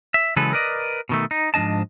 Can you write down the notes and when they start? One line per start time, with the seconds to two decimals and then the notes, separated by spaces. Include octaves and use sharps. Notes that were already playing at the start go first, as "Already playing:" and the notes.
0.14 E5
0.36 C#3 E3 F#3 G#3 A4 B4
0.53 A#4 B4 D5 D#5
1.09 B2 D#3 A3
1.31 D#4
1.54 G#2 F3 D4 D#5 A5